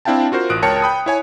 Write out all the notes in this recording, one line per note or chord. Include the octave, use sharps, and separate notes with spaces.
C4 D4 E4 F5 G5 A5
F4 F#4 A#4 C5
A1 D#6 F#6 D7
C#2 A#4 C#5 G5 A5 C#7
G5 B5 D#6
E4 C#5 G#5